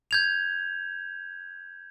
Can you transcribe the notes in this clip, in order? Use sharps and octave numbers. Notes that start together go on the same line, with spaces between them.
G6 G#6 F7